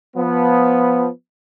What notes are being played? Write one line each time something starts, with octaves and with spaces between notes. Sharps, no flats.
F3 B3